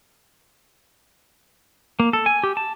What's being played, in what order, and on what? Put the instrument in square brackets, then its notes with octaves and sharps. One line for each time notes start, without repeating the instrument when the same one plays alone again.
[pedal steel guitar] A#3
A4
G#5
G4
A5